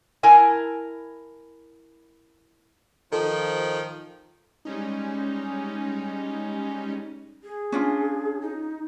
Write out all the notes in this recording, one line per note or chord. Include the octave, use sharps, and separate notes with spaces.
E4 A#4 G#5 A5
D#3 F3 A4
G3 G#3 C#4 D#4
G#4
C#4 D4 F4
D#4